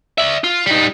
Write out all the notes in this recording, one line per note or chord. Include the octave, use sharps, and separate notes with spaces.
D5 E5
F4
G3 D#4